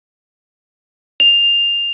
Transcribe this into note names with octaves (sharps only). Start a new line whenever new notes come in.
F7